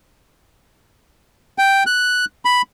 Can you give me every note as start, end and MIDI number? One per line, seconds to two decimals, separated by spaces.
1.58 1.84 79
1.86 2.25 90
2.45 2.62 83